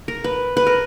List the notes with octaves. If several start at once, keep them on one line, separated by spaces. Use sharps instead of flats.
A#4
B4
B4
A#4